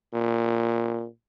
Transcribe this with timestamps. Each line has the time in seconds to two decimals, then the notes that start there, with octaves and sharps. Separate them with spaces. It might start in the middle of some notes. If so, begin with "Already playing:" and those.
0.14 A#2